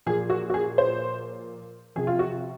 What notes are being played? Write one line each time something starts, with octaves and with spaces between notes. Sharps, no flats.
A#2 F3 G#4
F#4
F#4
G#4
C5
C3 F3 G#4
F4
F#4